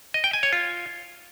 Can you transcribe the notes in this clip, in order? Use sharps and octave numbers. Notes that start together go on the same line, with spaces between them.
D#5
G5
G#5
C#5
F4